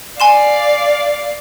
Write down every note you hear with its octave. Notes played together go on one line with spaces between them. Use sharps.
D5 F5 G#5 C6 E7